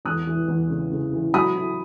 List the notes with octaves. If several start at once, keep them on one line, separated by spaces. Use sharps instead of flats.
E2 D#6 F#6
E3
E2
C#3
C#3
E3
F#3 B5 D#6
E4